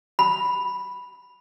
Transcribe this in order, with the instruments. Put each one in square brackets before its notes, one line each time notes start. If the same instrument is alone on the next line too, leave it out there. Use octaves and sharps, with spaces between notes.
[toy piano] B5